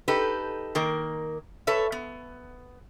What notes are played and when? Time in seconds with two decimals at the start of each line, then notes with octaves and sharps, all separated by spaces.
0.08 D#4 G4 A4 B4
0.75 D#3 A#3 A#4
1.67 A4 B4 C#5 E5
1.92 B3